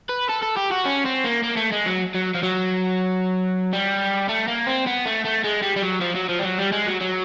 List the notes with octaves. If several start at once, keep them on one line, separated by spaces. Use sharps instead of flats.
B4
A4
A4
G4
F#4
C#4
C4
A#3
A#3
A3
G#3
F#3
F#3
F3
F#3
G3
A3
A#3
C4
B3
A3
A3
G#3
G3
G3
F#3
F3
F#3
F3
G3
F#3
G3
G#3
F#3
F#3